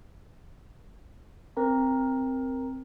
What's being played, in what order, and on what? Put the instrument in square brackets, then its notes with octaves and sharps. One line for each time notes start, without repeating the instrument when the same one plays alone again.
[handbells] C4 A#4 A#5